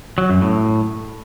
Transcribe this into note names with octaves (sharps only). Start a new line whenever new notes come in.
F#3
F#2
A2